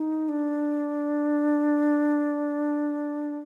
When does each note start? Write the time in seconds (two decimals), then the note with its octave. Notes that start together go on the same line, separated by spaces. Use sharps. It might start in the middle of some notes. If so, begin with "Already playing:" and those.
Already playing: D#4
0.29 D4